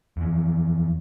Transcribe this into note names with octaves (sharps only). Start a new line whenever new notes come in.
F2 E3